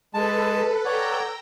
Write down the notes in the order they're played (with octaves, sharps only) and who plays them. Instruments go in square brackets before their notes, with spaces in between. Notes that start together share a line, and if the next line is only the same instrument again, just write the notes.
[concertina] G#3 A5 [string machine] A4 B4
[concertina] C#5 D5 F#5 [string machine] G5 A#5 E6